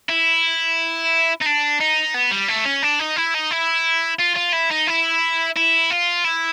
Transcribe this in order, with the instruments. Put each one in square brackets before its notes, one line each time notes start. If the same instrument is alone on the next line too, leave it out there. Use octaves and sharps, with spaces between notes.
[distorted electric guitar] E4
D#4
D4
D#4
B3
G3
A3
C#4
D4
D#4
E4
D#4
E4
F4
F4
E4
D#4
E4
E4
F4
E4